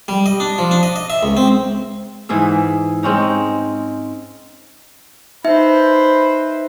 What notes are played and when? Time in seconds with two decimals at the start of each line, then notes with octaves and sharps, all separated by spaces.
0.08 G3
0.26 D#5
0.40 D4
0.58 F3
0.71 D4
0.83 D#5
0.96 D#5
1.10 E5
1.23 C#2
1.37 C4
2.29 G#2 E3 G#4 E5
3.03 G#3 C4 C#4 D#4
5.44 D#4 B4 C5 E5